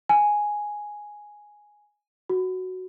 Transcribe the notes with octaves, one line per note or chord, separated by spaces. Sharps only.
G#5
F#4